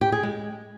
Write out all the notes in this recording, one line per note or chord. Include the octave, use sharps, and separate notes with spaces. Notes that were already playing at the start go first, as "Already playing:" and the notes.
G4
G#4
G#3